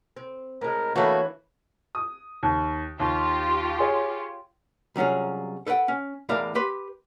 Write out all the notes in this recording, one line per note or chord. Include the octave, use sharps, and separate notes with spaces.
C4
A2 G#3 A#4
E3 A3 A#3 D4 F#4 B4 C#5
D#6
D#2
D#2 F4 G4
G#4 C#5
C2 F#3 C#4 F4 G#4
A4 B4 C5 F#5 G5
C#4
E2 A2 E3 A#4 D5 F5
G4 B4 C6